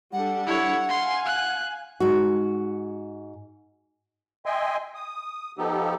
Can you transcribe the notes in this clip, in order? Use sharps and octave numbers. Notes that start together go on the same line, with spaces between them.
G3 D4 A4 F#5
E4 C#5
F5 G#5 C6
F#6
G#2 F#4
D#5 E5 G5 G#5 C6
D#6
F3 B3 D#4 G4 A4